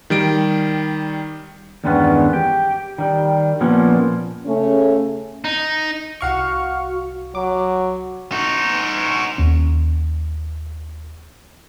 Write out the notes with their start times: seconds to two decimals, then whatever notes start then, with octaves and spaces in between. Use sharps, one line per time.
0.10 D#3 G3 D7
1.84 E2 G2 D#3 G#3 B3 C#4
2.33 G4
2.98 D#3 G3
3.60 A#2 F3 A#3 B3 C#4
4.46 C#3 A3 C#4
5.44 D#4
6.21 C2 F#4 F5 C#6 F6 C#7
7.35 F#3 D6
8.32 D#4 F#4
9.38 D#2 C#4